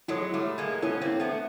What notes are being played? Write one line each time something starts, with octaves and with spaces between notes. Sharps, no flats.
F#3 G#3 E4 A4 C#5
G3 A3
G#3 A#3
B3 C#4 E4 A4 C#5
A#3 C4
A3 B3